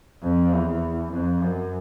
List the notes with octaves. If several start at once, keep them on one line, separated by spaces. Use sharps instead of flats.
F2
E2
F2
F#2